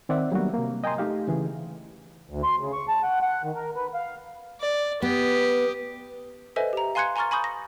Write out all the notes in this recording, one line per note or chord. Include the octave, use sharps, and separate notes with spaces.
D#3 C4 D5 E5 F#5
F#3 G3 A#3 B3 D4 F#4
C3 A#3
D#5 G5 G#5 A#5 C6 D#6
A3 D#4 G4 F5
C#3 E3 G#4
D2
C6
C#3
C#6
A5
F#5
F#5
D#3
A#4
B4
F5
D5
B3 G4 D#6
A4 B4 C5 D#5 E5 G#5
G4 A#5
F5 G#5 C6 F#6 G#6 C#7
G#5 A#5 C6 C#6 F6 A6
G#5 B5 C#6 D#6 G6
A#6